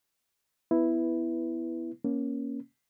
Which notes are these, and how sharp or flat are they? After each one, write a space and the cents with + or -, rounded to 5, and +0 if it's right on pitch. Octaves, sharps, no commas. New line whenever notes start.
B3 +10 E4 +0 B4 +0
A#3 +15 C#4 +0